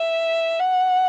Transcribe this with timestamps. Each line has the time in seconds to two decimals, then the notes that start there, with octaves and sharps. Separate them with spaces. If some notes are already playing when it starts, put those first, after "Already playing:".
Already playing: E5
0.59 F#5